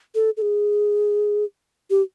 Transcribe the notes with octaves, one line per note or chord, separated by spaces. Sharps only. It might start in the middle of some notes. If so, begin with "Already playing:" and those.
A4
A4
G#4
G4